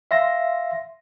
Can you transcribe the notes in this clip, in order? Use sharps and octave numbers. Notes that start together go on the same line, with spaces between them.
E5 F5 C6 A#6